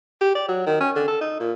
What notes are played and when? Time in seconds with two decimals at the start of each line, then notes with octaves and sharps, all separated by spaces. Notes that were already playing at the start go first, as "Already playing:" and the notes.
0.21 G4
0.35 D5
0.49 F#3
0.67 D#3
0.80 C#4
0.96 D3
1.08 A4
1.21 D#4
1.40 A#2